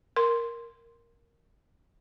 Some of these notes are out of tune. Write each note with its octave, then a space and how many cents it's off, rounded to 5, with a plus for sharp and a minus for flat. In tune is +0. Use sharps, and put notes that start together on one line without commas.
A#4 +0 C6 +0